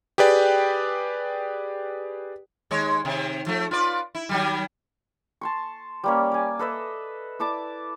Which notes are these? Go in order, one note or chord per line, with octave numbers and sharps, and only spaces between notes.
G4 G#4 B4 D5 G5
D#2 G#3 C#5
C3 D#3
F3 A3
F4 B4 D5
E4
D#3 F#3 G3
A5 C6 C#6
G3 A#3 C#4
D5 G#5
A4 B4 D#5 E5
E4 D5 A5 D6